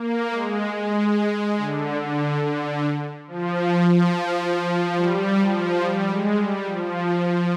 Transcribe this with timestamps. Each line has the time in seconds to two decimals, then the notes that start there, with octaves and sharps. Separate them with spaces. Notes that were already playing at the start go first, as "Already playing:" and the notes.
Already playing: A#3
0.31 G#3
0.73 G#3
1.58 D3
2.01 D3
2.42 D3
3.27 F3
4.96 G3
5.39 F3
5.81 G3
6.08 G#3
6.37 G3
6.65 F3